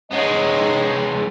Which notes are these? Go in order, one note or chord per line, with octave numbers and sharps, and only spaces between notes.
G#3 B3 D#4 C#5 D#5